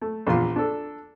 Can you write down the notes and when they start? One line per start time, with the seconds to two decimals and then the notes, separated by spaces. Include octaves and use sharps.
0.01 A3
0.27 A#1 E2 F4 C6
0.56 D4 A4